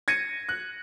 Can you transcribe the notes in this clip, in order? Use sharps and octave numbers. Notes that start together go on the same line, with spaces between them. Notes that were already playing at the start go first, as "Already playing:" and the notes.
G#6 A#6 C#7 D#7
F#6